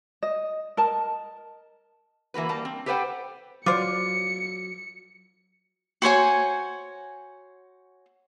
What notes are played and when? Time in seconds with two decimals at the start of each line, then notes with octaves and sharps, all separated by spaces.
0.23 D#5
0.77 A#4 D#5 A5
2.34 E3 A#3 F#4 B4
2.49 G3 A#3 A5
2.65 C4
2.86 G4 A4 B4 C5 F#5 G5
3.66 F#3 F4 C5 D5 D6 C#7
6.02 F#4 C5 C#5 G#5